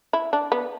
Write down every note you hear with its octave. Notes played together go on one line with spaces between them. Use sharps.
E4
D4
B3